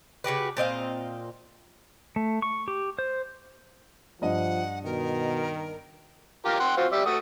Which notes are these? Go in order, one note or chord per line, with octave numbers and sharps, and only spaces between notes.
C#3 F#4 G4 B4
A#2 C4 D#5 F5
A3
C#6
G4
C5
G2 F3 D#5 F#5
B2 D#3 A#4
F4 G4 A#4
F#5 G5 C6
C4 F4 F#4
G3 D5 E5
A3 F#4 D#6